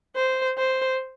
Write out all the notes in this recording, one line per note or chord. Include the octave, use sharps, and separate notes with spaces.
C5
C5